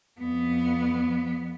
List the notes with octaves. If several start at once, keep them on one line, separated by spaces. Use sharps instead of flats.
F2 B3